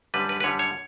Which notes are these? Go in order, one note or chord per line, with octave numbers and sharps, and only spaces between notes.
F#2 D3 G3 B4
B4
B4
F#2 D3 G3 C#5
C#5